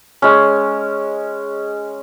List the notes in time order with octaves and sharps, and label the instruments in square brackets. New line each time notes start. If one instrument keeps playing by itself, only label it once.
[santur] G#3 C#4